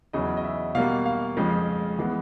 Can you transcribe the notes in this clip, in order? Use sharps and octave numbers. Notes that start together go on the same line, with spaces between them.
E2 C#3 F#3 D#5
D#5
E5
B2 G3 A#3 F5
F5
F2 C#3 F3 G#3
E3 G#3 B3